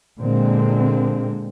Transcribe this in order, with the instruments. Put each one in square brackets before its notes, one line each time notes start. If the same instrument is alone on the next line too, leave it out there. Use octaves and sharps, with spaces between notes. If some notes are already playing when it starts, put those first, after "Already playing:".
[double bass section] A#2 D3 G#3 C4